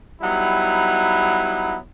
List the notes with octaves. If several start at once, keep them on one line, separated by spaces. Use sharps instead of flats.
F#3 G3 B3 D#4 E4